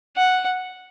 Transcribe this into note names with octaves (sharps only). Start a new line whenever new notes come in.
F#5